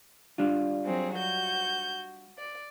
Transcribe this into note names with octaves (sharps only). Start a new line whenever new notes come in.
G3 D4 F4
F#3 C4 G#4
F#4 G6
D5